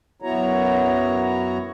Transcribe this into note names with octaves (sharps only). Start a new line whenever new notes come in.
F#2 B3 E4 F#4 C#5 A#5